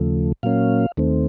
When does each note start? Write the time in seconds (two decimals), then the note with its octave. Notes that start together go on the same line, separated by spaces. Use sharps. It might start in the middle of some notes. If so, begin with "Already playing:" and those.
Already playing: D#2 C#3 F3 A3
0.43 A#2 F#3 A#3 C#4 F5
0.97 D#2 D#3 A3 C4